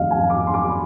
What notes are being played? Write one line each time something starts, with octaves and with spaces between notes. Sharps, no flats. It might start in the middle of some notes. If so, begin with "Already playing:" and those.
Already playing: F1 F2 D#3 D#5 F5
G#5
D6
C6
D6
B5